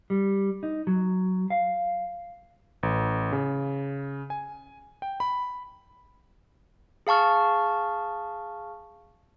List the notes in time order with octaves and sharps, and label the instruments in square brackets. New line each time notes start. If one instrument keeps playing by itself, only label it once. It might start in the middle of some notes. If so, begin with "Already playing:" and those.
[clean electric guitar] G3
D#4
F#3
F5
[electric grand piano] A1
C#3
G#5
G5
B5
[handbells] G#4 F5 A5 C#6 F6